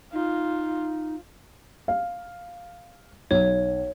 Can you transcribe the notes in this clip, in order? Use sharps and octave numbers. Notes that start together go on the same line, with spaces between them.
D#4 F4
F5
B1 C#5